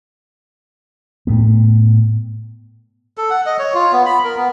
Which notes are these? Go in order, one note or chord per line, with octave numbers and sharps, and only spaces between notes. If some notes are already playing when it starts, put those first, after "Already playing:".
A2 A3 B3
A4
F#5
D#5
C#5
F4
B3
B5
A#4
B3